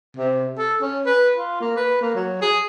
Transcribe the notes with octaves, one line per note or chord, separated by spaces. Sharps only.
C3
A4
C#4
B4
F4
A#3
B4
A#3
F#3
G#4